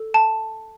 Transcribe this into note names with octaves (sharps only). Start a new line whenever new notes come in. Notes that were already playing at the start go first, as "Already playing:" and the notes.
Already playing: A4
A5